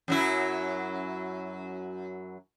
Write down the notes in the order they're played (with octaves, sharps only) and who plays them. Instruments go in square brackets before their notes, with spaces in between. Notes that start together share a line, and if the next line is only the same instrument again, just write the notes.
[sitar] F#2 F#3 E4